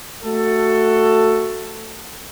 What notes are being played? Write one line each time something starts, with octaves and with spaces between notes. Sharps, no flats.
A3 F#4 A4